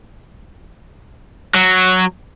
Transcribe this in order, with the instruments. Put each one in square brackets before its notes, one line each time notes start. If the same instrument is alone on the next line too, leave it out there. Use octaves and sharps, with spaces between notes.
[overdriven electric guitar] F#3